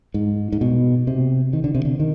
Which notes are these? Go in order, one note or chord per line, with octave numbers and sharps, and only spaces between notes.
G#2
G#2
B2
C3
D#3
D3
C3
D3
D#3